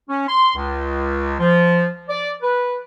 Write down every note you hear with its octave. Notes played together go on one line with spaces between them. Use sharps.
C#4
C6
C#2
F3
D5
B4